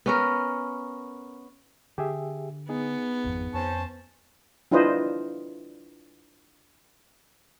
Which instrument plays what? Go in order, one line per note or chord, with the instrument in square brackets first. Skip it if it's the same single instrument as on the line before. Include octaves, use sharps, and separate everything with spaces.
[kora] B3 C#4 A#4
[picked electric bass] D3 [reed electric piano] G4 G#4 E5
[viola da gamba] B3 [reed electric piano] D#4 G#4
[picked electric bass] G#1 F2 F3
[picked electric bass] F2 [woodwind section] C#4 C5 A5
[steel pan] D4 E4 F4 B4 C5 D#5